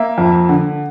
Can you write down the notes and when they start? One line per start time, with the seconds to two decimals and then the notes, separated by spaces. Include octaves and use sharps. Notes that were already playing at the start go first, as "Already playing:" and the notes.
Already playing: A#3 E5
0.18 F2
0.49 D3